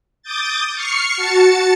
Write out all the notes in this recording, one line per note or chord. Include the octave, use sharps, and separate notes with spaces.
D6 D#6 G6 A6
C#6 F6 C7 C#7
F#4 A5 A6 C#7